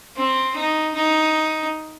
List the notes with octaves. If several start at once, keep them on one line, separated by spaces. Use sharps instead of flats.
C4
D#4
D#4